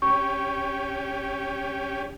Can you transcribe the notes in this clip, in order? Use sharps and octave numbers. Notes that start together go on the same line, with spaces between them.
C#4 G4 C#6